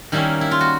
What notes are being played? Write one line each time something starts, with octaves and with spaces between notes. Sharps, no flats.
D#3 G3 A#3 C#4 E4
E4
F4
F#4